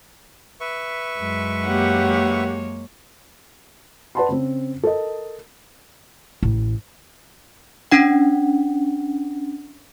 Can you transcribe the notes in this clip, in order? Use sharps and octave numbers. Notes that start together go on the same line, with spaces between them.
B4 E5 C#6
F#2 G#3
A#3 G4 C#5 F#5
B4 D5 F#5 A5 B5 C6
C#3 C4
A4 A#4 D#5
A1
C#4 D4 F#5